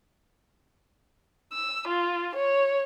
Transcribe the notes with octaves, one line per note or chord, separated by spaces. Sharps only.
E6
F4
C#5